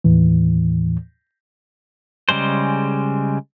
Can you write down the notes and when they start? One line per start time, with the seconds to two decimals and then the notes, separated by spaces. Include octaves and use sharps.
0.04 D#2 A2 E3
2.29 C#3 G3 G#3 C5